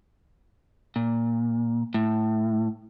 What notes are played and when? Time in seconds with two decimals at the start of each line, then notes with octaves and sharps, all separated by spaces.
0.96 A#2
1.94 A2